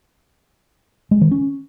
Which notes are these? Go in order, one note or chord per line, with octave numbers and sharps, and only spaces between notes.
G#3
D#3
C#4